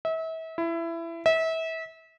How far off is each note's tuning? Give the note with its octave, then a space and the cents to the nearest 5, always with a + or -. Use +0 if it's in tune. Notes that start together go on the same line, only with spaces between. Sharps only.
E5 -35
E4 +20
E5 -30